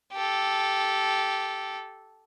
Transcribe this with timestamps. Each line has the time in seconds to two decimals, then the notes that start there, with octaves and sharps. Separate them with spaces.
0.13 G4 A4